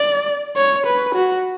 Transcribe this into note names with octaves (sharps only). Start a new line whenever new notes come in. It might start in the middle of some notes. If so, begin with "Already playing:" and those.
Already playing: D5
C#5
B4
F#4